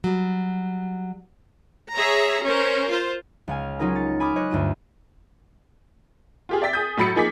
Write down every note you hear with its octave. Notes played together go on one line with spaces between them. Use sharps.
F#3 G3
G#4 C#5 E5 A#5
C#4 A#4 C5
F4 C5
C#2 F5 G#5
F#3 C#4 D#4 F4 G#4 A#4
A6 C#7
G#5 B5 D6 D#6 F6
C#5 D#5 C#6 F#6
D2 G2 F4 D#7
F4 G4 G#4
D5 E5 G5 A6 B6
G#4 D#6 G6
A2 F#3 B5 A6 C#7
F3 A#3 D#4 G#4 D6 B6